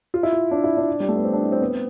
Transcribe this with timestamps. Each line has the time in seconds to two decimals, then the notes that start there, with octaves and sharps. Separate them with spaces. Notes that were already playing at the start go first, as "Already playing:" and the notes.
0.14 F4
0.23 E4
0.33 F4
0.51 D4
0.64 E4
0.77 D4
1.00 G3
1.08 A3
1.16 B3
1.24 C4
1.33 D4
1.43 E4
1.52 C4
1.62 B3
1.69 C4